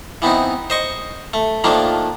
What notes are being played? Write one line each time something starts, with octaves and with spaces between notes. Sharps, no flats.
E3 B3 C4 D#4
C5 D#5 C#6
A3
D#3 F3 A3 A#3 D4